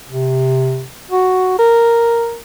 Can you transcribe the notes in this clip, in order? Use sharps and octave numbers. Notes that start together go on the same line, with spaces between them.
C3
F#4
A#4